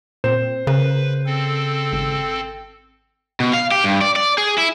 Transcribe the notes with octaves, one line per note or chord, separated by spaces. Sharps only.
A#2 C4 C5 E7
C#3 A#4 B4
C4 A4
G#1
B2
F5
G4
G2
D5
D5
G#4
E4